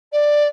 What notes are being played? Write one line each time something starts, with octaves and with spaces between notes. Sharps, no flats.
D5